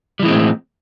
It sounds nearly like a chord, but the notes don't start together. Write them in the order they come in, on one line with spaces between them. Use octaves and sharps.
G3 E3 G#3 C4 A2